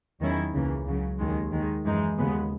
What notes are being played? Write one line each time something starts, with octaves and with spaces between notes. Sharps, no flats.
E2 D#3 F#3 C#4 E4
C#2 C#3 E3 A#3
C#2 C#3 F#3
D#2 D#3 G#3
D#2 D#3 G#3
F#2 E3 G#3 D#4
D#2 C#3 G#3 B3